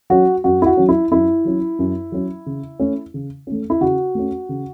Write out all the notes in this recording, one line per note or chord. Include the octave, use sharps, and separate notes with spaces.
F#3 C#4 F#4
F#2 F#4
E4
F#4
F#3 C#4
E4
F#2 E4
F#3 C#4
F#2
F#3 C#4
C#3
A3 C#4
C#3
A3 C#4
E4
C#3 F#4
A3 C#4
C#3